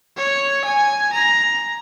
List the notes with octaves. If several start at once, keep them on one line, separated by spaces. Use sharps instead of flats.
C#5
G#5
A#5